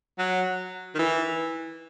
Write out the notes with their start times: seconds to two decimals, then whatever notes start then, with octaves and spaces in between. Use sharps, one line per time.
0.18 F#3
0.95 D#3
0.99 E3